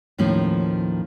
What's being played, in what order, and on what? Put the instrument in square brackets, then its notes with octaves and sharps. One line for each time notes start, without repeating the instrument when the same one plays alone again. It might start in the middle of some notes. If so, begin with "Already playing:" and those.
[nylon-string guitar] D#2 A2 D#3 F3 C#4